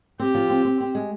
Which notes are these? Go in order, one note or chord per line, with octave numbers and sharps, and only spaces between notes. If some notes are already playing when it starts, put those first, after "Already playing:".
C4 G4
F3
C4
C4
C4
G#3